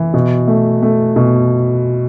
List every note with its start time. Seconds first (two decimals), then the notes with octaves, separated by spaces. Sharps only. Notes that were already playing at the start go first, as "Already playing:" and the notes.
Already playing: E3
0.14 B2
0.48 A3
0.82 A3
1.16 B2